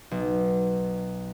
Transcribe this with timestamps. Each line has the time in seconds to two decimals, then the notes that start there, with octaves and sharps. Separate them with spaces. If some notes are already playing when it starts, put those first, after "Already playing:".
0.11 B1